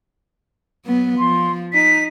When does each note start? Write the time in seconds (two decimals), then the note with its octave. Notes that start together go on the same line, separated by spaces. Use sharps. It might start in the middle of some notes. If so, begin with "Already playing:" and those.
0.85 F#3 B3
1.18 F3 C6
1.73 D#4 B6